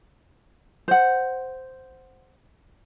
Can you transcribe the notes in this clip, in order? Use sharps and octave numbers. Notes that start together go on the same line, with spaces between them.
C5 F#5